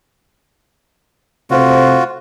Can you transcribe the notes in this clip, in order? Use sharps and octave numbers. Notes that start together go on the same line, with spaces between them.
C3 A3 F4 F#4 C5